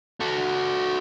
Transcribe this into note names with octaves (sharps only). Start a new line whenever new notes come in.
F#4 A4